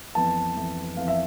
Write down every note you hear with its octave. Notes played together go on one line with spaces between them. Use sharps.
F2 E3 B3 A5
F2 E3 B3
F2 E3 B3 F5
E5